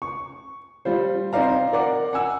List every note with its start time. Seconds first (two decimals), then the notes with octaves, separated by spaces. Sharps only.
0.02 C#6
0.85 G3 F4 C5
1.33 C4 D#4 C5 D5 F5 A#5
1.73 A#4 D5 F#5 D6
2.13 F#5 G#5 E6